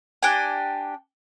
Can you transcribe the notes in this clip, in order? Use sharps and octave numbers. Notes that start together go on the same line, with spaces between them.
D4 G4 G5 G#5